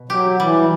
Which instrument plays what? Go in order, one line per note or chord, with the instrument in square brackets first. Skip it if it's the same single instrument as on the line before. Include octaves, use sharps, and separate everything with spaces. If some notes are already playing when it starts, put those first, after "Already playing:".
Already playing: [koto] B2
[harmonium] F#3 [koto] G4
[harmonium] E3 [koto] G3